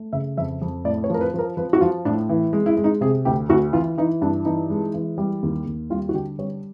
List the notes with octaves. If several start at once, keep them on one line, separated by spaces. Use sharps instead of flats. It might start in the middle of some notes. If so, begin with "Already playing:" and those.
Already playing: A3
C#3 E5
F2 E5
F2
A2 D5
C#5
F3 A#4
B4
F3 A#4
F3 B4
F#4
F3 F4
A2 D4
E3
G#3
E4
G#3
D#4
C3 G#4
D2 G4
D2 F#4
E3 F4
E3 D#4
G2 D4
E3 D#4
G#3
E3
G3
D#2
D#2
G3 F4
F#4
D3 G4
G3 C#5